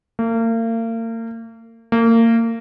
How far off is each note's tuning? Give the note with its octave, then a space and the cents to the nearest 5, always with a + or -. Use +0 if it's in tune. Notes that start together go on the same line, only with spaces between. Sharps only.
A#3 -40
A#3 -30